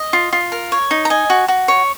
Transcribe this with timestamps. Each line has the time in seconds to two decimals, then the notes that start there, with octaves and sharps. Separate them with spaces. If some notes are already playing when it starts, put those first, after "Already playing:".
Already playing: D#5
0.13 F4
0.33 F4
0.52 A#4
0.72 C#5
0.91 D#4
1.05 A#5
1.10 D#5 G#5
1.30 F#4
1.48 F#4
1.68 C#5